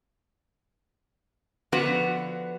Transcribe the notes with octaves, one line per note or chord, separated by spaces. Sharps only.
D3 F3 B3 F#4 B4